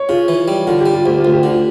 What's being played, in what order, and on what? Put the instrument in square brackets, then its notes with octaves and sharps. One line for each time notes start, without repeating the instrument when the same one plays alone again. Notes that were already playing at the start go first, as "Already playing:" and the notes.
Already playing: [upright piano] C#5
[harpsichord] C#3 [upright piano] F4
[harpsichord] E3
G3
[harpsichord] D3 [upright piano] F4
[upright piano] G4
[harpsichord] G3
[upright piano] F4
[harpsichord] D2 [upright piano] G4
[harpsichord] D2 [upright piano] F4
[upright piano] G4
[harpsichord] D3 [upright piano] F4